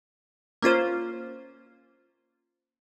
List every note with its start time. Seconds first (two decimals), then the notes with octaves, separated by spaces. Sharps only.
0.62 A#3 C#4 F4 C5